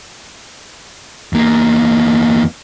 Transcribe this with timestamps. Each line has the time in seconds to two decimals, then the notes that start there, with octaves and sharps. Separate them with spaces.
1.33 E2 A#3